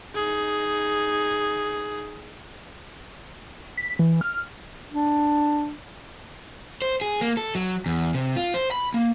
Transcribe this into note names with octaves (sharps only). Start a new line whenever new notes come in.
D#4 G#4
B6
E3
F6
D4
C5
G#4
A#3
A4
F#3
E2
C3
F4
C5
B5
A#3